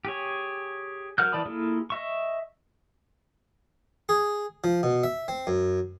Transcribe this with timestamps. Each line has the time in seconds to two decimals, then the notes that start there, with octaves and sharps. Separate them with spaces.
0.05 G4 G#4 C#5
1.18 F#3 A#4 F#5 F6 G6
1.32 E3 D5 A5 B5 D#6
1.46 A#3 E4 F4 G#4 A4
1.90 D#5 E5 C#6
4.09 G#4
4.64 F3
4.83 B2
5.04 E5
5.28 C4
5.47 F#2